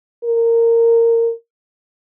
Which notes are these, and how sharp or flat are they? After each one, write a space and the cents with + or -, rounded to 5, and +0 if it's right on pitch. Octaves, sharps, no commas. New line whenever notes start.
A#4 -15